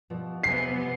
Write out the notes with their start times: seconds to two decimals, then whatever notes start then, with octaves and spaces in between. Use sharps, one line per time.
0.10 G2 B2 F3
0.43 C3 F#3 B3 G#5 C7